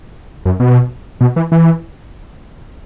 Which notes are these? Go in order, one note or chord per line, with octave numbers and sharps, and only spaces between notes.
F#2
B2
B2
E3
E3